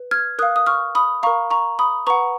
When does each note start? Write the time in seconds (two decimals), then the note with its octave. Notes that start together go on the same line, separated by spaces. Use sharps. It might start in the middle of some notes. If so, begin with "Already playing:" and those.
Already playing: B4
0.11 F6 G#6
0.39 A#4 F5 D#6 F#6
0.56 D#6
0.67 C#6 F6
0.95 B5 D#6
1.23 A#4 F5 A#5 C#6
1.51 A#5 C#6
1.79 B5 D#6
2.07 B4 F#5 A#5 C#6